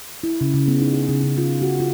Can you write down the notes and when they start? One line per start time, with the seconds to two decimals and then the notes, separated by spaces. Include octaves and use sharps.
0.23 E4
0.41 C#3
0.54 C#3
0.68 B3
0.81 D#4
0.94 G#4
1.09 C#3
1.24 C#3
1.38 F4
1.62 F#4
1.80 F4